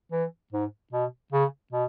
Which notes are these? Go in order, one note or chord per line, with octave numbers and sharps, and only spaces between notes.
E3
G#2
B2
C#3
B2